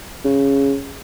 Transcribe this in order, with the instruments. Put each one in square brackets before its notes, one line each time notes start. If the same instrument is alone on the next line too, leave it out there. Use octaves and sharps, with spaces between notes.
[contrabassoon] C#3